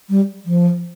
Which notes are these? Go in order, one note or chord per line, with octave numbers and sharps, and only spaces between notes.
G3
F3